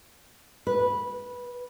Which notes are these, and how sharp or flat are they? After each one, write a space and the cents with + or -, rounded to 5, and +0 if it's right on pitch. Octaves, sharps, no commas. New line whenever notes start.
B4 -10